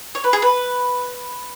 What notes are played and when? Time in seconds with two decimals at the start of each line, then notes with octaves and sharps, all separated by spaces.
0.15 C#5
0.24 B4
0.33 G#4
0.42 B4